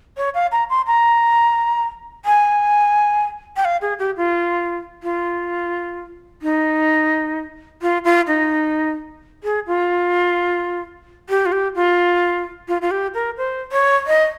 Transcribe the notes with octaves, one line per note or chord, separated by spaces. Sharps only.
C#5
F5
A#5
C6
A#5
G#5
G5
F5
G#4
G4
F4
F4
D#4
F4
F4
D#4
G#4
F4
G4
F4
G4
F4
F4
F4
G4
A#4
C5
C#5
D#5